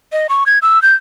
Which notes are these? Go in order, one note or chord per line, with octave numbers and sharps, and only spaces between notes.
D#5
C#6
G#6
E6
G6